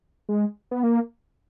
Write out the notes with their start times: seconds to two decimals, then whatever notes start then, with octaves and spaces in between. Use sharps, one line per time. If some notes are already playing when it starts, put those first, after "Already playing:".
0.29 G#3
0.71 B3
0.83 A#3